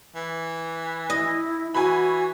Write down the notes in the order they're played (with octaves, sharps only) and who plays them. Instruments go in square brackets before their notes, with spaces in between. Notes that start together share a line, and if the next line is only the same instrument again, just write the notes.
[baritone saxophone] E3
[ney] E4 [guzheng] D#5
[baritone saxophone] E3 [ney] F#4 [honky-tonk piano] G#5 B5